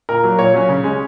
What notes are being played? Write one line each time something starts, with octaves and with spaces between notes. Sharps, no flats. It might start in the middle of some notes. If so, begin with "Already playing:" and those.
A#2 A#4
F#3 A#3
A#2 C#5
F#3 C#4
C#3
G#3 C#4